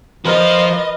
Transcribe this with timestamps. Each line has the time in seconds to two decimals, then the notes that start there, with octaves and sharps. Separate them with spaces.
0.25 F3 F4 A#4 B4 D#5